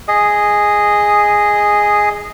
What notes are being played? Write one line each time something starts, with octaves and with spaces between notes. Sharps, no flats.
G#4 D#5 D#6